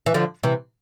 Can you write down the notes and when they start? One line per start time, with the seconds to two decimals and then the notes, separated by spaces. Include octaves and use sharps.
0.06 E3
0.14 D3 F3
0.43 C3 E3